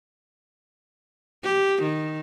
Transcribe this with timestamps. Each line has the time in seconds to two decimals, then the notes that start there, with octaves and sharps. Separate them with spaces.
1.44 G4
1.83 D#3